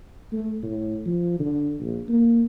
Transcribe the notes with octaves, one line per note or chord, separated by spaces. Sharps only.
A3
A2
F3
D3
A#1
A#3